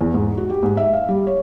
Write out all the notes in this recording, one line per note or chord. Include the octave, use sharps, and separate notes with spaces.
E2
G#2
F#4
G4
G#2
E5
F5
G3
C#5